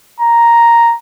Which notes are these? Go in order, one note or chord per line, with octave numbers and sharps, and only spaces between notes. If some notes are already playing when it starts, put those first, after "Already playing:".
A#5